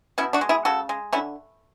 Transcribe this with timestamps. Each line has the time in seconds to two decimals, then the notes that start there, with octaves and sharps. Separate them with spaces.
0.18 B2 C#4 E4
0.33 D4 F#4
0.41 G#3
0.49 E4 G#4
0.65 C#3 F#4 A4
0.89 G#3
1.12 D3 C#4 E4